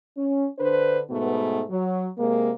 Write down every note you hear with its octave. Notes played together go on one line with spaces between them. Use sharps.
C#4
D3 D4 B4 C5
G#2 B2 A3 B3
F#3
C3 G#3 A#3